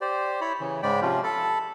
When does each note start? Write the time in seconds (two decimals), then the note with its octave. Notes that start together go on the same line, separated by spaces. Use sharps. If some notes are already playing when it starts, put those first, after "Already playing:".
0.01 G4 C5 D5
0.41 E4 C#5 B5
0.60 C#3 E3
0.83 G#2 C#3 G#3 D5 G5 B5
1.02 C3 F3 C#4 F4
1.24 A4 A5 B5